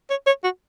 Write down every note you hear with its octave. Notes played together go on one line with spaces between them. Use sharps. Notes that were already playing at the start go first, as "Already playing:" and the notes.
C#5
C#5
F#4